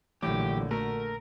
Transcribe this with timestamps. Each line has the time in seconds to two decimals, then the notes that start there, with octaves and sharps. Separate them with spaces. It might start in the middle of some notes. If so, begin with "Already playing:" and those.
0.22 A#1 A2 D3 E3 F#3 G4
0.71 A3 F#4 A#4